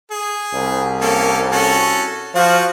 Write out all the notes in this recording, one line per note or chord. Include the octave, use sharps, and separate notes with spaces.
G#4
C2
A#3 C#4 A4
C#4 F#4 A4
F3 F4 F#4